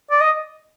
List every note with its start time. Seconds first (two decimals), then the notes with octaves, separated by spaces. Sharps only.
0.11 D5
0.20 D#5